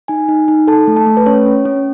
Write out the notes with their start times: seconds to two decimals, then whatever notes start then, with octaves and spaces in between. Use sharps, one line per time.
0.08 D#4 G#5
0.28 D#4
0.48 D#4
0.67 A4 A5
0.87 A3
0.96 A5
1.06 A3
1.17 B4
1.26 C#4 C#5
1.46 C#4
1.65 C#4